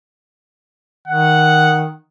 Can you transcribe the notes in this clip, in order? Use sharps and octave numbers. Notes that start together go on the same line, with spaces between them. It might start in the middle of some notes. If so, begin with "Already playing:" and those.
D#3 F#5